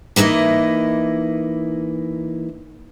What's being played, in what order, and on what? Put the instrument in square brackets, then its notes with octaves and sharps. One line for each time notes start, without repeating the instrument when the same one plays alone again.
[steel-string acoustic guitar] E3 A#3 D#4 E4 D#5